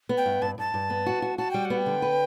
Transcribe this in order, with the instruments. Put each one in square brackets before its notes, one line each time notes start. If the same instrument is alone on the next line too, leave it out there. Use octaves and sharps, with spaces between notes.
[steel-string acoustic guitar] B3
[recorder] G5
[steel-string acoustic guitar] G2
[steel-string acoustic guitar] G2 [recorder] A5
[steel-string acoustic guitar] G2 [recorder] A5
[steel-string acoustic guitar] G2
B3
F#4
F#4
[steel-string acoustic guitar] F#4 [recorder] A5
[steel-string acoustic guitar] G3 [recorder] G5
[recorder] F#5
[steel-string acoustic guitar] B3
[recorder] G5
[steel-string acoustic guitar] D3
B4